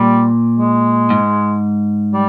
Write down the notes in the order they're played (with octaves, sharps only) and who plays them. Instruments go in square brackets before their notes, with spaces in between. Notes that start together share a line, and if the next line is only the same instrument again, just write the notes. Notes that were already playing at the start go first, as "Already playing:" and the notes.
Already playing: [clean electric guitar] A#2 [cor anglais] G3
[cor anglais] G#3
[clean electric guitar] G#2
[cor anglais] G3